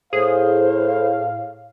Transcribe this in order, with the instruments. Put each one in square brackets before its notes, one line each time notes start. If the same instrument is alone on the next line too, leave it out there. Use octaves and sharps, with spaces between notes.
[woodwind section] A2 [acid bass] G#4 [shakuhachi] C5 [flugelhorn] F5